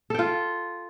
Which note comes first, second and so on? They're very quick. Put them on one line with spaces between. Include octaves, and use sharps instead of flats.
A4 G5 F4